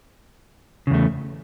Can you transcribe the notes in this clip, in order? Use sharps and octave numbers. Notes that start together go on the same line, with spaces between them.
E2 C#3 A3